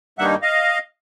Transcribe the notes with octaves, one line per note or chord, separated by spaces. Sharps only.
G2 D#3 G3 A#3 D#4 E5 F#5
D#5 F5